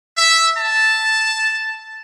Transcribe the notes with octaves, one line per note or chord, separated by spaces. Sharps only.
E5
A5